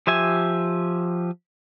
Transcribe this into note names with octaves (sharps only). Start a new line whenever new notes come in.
F3 G4 E5 G#5